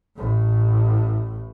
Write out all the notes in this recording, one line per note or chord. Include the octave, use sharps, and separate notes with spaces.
A1 A2